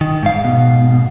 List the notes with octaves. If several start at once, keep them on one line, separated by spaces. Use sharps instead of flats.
D#3
G#2 F5
B2